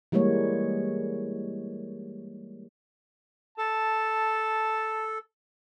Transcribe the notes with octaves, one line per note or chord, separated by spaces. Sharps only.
E3 G3 G#3 A#3 C#5
A4 A5